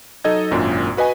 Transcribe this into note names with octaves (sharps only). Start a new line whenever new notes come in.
F#3 D#4 A4 D#5 G#6
G#1 F#2 A#2 D4 F4
F#4 B4 D#5 G#5